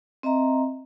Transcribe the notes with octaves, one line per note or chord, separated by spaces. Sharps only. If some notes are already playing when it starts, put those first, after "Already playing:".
C4 D#5 E5 A#5